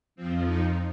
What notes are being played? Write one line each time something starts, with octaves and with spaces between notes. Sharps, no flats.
F2 F3 C4
D#4